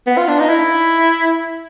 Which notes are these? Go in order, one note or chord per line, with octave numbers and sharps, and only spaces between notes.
B3
F4
D4
D#4
E4